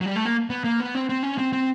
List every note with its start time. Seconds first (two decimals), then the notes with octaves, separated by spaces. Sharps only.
0.01 F#3
0.06 G3
0.16 A3
0.25 A#3
0.50 B3
0.64 A#3
0.80 B3
0.95 C4
1.09 C4
1.23 C#4
1.38 C4
1.53 C4